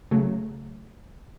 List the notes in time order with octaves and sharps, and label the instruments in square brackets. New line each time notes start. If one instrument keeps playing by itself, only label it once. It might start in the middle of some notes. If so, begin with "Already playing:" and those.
[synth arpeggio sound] C#3 F#3 A3